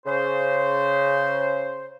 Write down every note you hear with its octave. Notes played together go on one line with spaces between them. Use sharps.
C#3 C5